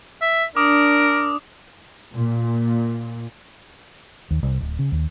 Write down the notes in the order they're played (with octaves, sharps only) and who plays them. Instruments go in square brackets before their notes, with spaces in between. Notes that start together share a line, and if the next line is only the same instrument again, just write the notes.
[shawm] E5
[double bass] D4 [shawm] A#4 [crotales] D6 D#6
[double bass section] A#2
[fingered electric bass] D#2
C2
D1
C#3
D#2